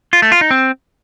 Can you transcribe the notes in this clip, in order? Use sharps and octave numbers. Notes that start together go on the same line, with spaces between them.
F4
A3
F4
D#4
C4